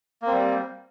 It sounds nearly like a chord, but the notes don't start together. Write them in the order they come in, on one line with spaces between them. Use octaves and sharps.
A#3 C4 G3